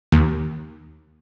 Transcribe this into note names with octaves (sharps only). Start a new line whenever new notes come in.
D#2